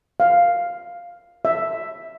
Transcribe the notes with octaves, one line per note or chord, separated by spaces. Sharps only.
F5
E5